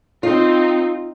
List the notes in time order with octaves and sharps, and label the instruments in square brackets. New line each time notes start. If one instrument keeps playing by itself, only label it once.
[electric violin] C4 D#4 [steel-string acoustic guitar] F4